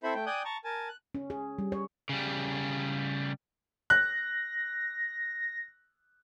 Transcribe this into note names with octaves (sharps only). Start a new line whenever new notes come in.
C4 E4 A4 C5 E5 B5
A3 G5
D5 G5 G#5 D#6 F#6 G6
A5 A#5 C#6
A#4 G#5 A5
F#6
C#4
G#4
G3
C#5
C#3 G3
F#6 A#6